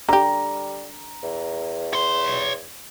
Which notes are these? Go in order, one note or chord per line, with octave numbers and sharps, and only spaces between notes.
D3 G3 G4 A#5
E2
C#5 C6